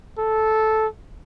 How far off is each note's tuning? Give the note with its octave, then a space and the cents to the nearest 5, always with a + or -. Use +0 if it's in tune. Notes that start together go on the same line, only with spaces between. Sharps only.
A4 -10